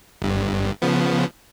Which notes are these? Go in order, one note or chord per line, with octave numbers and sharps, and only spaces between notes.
G1 G2
C#3 F3 B3